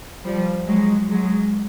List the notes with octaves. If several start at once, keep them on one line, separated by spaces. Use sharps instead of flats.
F3 G3
F#3 G#3
F#3 G#3